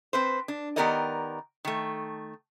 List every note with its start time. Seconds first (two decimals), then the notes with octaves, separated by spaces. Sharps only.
0.13 C4 B4 C5
0.48 D4
0.76 D#3 B3 G4 A#4 D5 D#5
1.65 D#3 A3